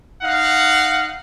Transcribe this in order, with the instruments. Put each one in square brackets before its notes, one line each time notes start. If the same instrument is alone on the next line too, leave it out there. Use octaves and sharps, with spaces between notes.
[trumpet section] D#4 F5 F#5